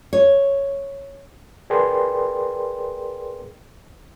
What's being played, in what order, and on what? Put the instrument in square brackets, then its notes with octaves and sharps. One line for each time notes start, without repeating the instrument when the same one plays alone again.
[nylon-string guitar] C#5
[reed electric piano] G#4 A#4 B4 D5 G5 C6